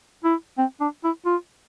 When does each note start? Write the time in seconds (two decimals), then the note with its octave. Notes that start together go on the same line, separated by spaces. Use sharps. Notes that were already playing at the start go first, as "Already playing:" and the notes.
0.24 E4
0.58 C4
0.81 D4
1.04 E4
1.26 F4